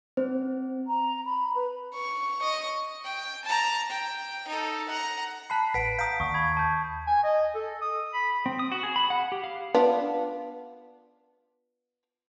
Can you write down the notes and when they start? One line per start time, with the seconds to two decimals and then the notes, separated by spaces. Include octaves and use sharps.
0.17 C4 C5
0.87 A#5
1.26 B5
1.55 B4
1.94 C#6
2.43 D#5 C#6
3.04 G5
3.44 A5 A#5
3.89 G5
4.47 D#4 A4
4.88 F#5 A#5
5.50 A5 B5 F#6 B6 C7
5.74 A1 B4 F#5 B6 D7
5.99 F5 A#5 D#6 G6
6.20 D#2 C#6 D#6
6.34 B5 G#6
6.57 A5 G6
7.07 G#5
7.24 D#5
7.55 A4
7.81 D#6
8.14 B5
8.46 C4
8.59 D#6
8.72 F#4
8.83 G#4
8.96 B5
9.10 F#5
9.32 G4
9.44 F5
9.74 B3 D4 F4